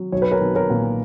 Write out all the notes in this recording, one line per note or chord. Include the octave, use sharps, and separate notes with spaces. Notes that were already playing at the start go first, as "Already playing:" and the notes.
Already playing: F#3
B1 C#5
B4
A#4 C#5
B1
A#4 C#5
A#2